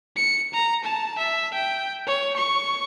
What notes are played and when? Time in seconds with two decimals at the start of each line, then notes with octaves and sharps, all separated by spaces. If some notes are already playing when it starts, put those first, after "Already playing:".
0.16 C#7
0.54 A#5
0.84 A5
1.18 E5
1.54 G5
2.07 C#5
2.36 C#6